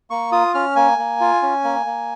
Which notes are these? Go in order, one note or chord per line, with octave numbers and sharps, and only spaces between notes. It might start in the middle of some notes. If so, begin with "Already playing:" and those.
A#3 C#6
F4 D#6
C#4 F6
A#3 G#5
A#3
F4
C#4
A#3
A#3